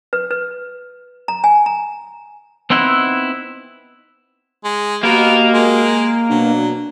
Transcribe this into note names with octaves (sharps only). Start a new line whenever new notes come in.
B4
B4
A#5
G#5
A#5
B3 C4 D#4 E4 F#5
G#3
A#3 B3 F#4 G4 A#4 D#5
G#3
B2 F#3 D4